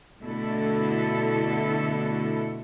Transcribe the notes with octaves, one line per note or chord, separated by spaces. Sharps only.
B2 D3 A3 E4 A4